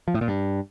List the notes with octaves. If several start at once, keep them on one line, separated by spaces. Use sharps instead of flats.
F3
A2
A#2
G2